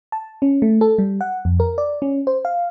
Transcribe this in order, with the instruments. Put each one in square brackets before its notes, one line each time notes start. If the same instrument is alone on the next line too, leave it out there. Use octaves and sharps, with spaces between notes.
[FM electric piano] A5
C#4
A3
A4
G3
F#5
F2
A#4
D5
C#4
C5
F5